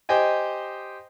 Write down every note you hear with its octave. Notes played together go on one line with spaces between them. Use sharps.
G4 C5 D#5 G5 G#5